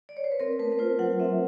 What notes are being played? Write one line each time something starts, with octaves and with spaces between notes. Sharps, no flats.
D5
C#5
C5
B4
C4 A#4
A3 B4
B4
F4 C5
F#3 F#5
C4 E5